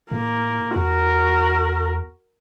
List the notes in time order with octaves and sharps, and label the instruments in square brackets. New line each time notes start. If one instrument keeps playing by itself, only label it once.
[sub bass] A2 [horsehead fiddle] A#3
[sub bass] E2 [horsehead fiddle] F#4 A#4